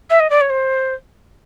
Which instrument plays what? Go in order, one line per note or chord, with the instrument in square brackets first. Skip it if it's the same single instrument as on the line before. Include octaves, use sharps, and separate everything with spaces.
[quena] E5
D#5
D5
C#5
C5